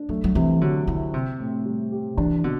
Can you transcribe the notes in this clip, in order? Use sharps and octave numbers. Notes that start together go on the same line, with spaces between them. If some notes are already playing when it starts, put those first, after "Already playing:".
Already playing: D4
F#3 A3
F#3
C3 E3
D3 F#3
D3 E4
C3 C4
A2
G3
G4
E3 D4
B2 D3